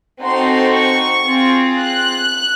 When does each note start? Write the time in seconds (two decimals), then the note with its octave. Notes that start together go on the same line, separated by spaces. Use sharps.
0.22 C4 D#4 F#4 A4 C6
0.74 C#6
1.26 C4 F4 G#4
1.80 F#6